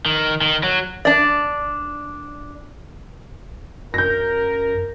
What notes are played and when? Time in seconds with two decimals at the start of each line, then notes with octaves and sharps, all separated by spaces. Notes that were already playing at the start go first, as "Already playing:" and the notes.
0.06 D#3
0.41 D#3
0.63 F#3
1.05 D4 D5
3.94 F#2 A#4 G6 A#6